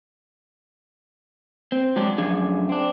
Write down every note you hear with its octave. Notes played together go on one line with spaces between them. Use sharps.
C4
F3 F#3 G#3 D4 G4
F#2 F3 A3 D4 G#4
C4 D4